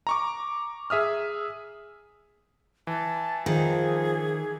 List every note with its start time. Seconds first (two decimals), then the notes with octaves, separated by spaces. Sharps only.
0.07 A#5 C#6 D6
0.90 G#4 E5 D#6 F6
2.87 E3 A5
3.46 D#3 F3 G#4